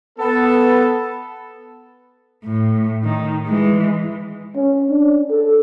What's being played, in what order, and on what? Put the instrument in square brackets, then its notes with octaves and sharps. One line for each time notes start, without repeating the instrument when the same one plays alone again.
[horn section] B3 A4
[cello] A2
D#3
E3 G#3
[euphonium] C#4
D4
A4